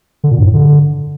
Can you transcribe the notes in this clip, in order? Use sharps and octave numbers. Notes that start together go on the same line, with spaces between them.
D3
A#2
G2
A2
D3